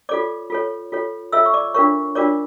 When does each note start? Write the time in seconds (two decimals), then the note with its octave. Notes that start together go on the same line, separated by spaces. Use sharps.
0.09 F4 A4 C#5 D5 D6
0.50 F4 A4 C#5
0.92 F4 A4 C#5
1.32 F4 A4 C#5 E5 E6
1.46 C#6
1.54 D5 D6
1.74 D4 F4 A#4 C#5 C#6
2.15 D4 F4 A#4 C#5 D5 D6